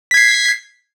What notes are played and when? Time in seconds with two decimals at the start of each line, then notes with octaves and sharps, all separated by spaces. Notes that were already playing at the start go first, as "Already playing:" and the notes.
0.11 B6
0.14 G#6
0.17 C7